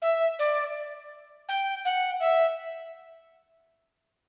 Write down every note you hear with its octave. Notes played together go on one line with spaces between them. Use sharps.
E5
D5
G5
F#5
E5